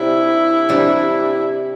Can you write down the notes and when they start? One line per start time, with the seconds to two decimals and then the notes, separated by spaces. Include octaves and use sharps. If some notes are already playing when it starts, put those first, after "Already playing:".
Already playing: C3 G3 D4 E4
0.69 C3 G3 D4